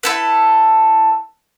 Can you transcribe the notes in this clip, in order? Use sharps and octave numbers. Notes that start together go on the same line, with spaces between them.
E4 A4 B4